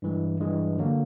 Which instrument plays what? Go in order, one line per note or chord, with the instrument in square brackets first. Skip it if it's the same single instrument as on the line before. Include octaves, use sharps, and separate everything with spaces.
[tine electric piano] G2 E3 G#3
G2 E3 G#3
D3 F#3 A#3